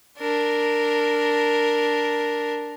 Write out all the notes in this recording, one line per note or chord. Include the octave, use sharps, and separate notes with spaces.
D4 A#4